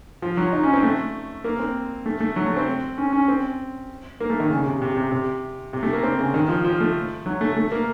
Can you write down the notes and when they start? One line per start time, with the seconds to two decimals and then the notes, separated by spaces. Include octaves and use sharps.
0.22 F3
0.37 F#3
0.53 D#4
0.63 C#4
0.73 C4
0.83 A3
1.44 A#3
1.59 C4
2.06 A3
2.20 A3
2.36 F#3
2.46 A3
2.57 C4
2.98 C#4
3.12 C#4
3.28 C4
4.20 A#3
4.30 A3
4.40 D#3
4.50 C#3
4.66 C3
4.82 C3
4.97 C3
5.12 C3
5.73 C3
5.83 A3
5.93 A#3
6.03 C4
6.19 C#3
6.34 D#3
6.49 F3
6.64 F3
6.80 A3
7.26 F#3
7.41 A3
7.56 A3
7.72 A#3